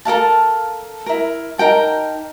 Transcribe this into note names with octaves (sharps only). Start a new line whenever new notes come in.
A4 A#4 F5 A5
E4 A#4
D#4 A#4 G5 A5